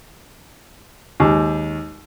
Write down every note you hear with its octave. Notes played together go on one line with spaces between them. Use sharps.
D#2 G#2